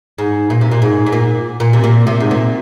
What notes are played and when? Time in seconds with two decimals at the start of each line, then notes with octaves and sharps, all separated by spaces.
0.18 G#2
0.50 A#2
0.61 C3
0.71 A#2
0.82 G#2
1.07 G#2
1.12 A#2
1.60 A#2
1.73 C3
1.84 A#2
2.07 C3
2.20 G#2
2.31 A#2